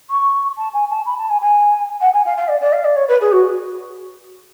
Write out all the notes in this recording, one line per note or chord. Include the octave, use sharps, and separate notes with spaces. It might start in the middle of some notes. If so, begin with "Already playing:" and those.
C#6
A5
G#5
A5
B5
A5
G#5
G#5
F#5
G#5
F5
F5
D5
D5
F5
D5
C#5
B4
G#4
F#4